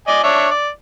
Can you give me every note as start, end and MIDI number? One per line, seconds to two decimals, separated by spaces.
0.08 0.20 74
0.08 0.20 75
0.08 0.20 80
0.24 0.47 62
0.24 0.47 73
0.24 0.47 76
0.51 0.68 74